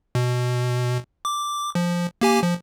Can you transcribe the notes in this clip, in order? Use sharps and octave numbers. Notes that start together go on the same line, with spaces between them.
B2
D6
F3
A#3 G4 G#5
F3